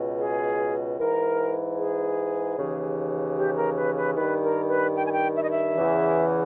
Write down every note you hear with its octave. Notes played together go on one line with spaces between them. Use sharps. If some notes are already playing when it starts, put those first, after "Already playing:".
Already playing: C#2 B2
G#4
G#2 E3 A#4
G#4
D#2 C#3 E3
G4
A#4
B4
B4
G2 D#3 B4
A#4
B4
G5
G#5
G5
E5
D#5
E5
E2 C#3 E3